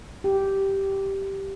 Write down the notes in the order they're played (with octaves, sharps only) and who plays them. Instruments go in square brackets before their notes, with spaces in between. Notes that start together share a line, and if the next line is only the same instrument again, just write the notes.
[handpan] G4